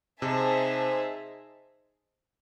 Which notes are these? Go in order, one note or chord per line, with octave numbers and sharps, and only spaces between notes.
C3 D#4 G#4 C5 E5 A5